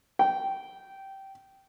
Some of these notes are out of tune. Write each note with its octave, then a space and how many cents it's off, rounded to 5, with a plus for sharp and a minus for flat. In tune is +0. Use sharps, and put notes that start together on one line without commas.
G5 -15